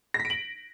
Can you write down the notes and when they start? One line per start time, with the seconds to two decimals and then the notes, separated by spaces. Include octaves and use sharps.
0.14 A#6
0.20 B6
0.25 D7
0.30 F#7